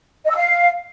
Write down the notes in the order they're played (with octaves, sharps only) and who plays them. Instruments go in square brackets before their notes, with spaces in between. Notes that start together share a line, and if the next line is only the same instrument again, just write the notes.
[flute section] D#5
E6
F5